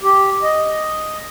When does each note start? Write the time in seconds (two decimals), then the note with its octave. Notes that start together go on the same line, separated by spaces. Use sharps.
0.01 G4
0.43 D#5